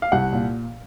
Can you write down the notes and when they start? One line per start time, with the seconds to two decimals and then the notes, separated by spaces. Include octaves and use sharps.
0.02 F5
0.12 C2 F#5
0.32 A#2